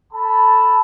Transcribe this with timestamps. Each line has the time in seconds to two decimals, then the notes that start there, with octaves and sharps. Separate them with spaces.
0.12 A4 A5 B5